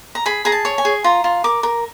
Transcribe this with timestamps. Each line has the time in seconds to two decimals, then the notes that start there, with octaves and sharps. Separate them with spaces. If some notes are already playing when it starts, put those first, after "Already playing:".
0.15 A#5
0.26 G#4 B5
0.45 G#4 A#5
0.52 A5
0.65 C#5
0.78 G#5
0.85 G#4
1.04 F4 A#5
1.24 F4
1.44 A#4 D6
1.63 A#4